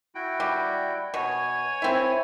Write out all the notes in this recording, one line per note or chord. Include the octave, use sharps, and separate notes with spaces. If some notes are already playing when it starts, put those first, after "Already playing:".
E4 F#4 G5
G3
B2 C#5 G#5
C4 E4